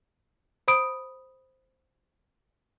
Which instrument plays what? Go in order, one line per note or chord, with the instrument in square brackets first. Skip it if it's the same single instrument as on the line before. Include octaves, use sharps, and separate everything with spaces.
[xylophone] C5 B5 D#6 D7